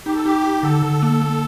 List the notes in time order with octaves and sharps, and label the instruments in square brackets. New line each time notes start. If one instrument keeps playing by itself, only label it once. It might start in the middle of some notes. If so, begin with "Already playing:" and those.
[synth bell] D#4 [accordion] G4
[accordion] A4
[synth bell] D#4 [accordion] G4
[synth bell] D#4
[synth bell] D3 [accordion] A4
[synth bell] D3
A#3
A#3